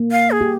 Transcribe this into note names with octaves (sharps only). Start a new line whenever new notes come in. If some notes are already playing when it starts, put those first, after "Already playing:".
Already playing: A#3
F5
G#4
G4